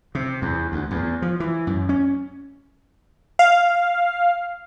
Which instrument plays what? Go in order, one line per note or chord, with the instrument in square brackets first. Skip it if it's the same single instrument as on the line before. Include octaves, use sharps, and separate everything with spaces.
[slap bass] C3
E2
D2
E2
F3
E3
F#2
C#4
[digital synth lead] F5